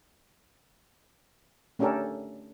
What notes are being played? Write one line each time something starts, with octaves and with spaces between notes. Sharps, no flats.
A3 C#4 D4 G4 A4 A#4